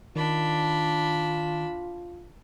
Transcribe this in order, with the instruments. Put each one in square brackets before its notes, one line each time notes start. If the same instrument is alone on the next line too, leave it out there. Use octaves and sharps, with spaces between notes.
[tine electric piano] D#3 [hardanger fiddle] D4 B5 [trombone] F4